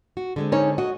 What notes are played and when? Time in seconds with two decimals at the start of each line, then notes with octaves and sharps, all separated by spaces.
0.17 F#4
0.36 D3 G#3 C4
0.52 C#4 D#4 C#5
0.78 F#4 D#5